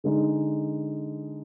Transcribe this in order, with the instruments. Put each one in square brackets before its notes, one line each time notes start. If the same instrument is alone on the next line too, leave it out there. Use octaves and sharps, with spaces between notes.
[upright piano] D3 G#3 D#4